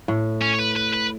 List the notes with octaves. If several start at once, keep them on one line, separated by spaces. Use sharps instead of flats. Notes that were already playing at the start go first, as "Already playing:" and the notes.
A2
C#4
C#5
B4
B4
B4